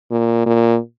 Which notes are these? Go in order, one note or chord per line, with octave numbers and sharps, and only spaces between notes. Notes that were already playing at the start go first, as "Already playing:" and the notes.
A#2
A#2